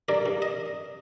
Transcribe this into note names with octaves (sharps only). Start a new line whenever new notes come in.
G2 A#4 D5
G2
D#5